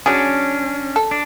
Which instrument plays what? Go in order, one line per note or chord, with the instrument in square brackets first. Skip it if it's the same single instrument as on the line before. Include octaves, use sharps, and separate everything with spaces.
[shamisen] F#3 G#4 [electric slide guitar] C#4 D4
[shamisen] A4
[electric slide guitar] D4